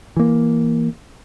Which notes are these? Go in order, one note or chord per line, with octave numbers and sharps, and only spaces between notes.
E3 A#3